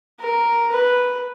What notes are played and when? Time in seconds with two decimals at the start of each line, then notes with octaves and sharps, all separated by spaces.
0.20 A#4
0.71 B4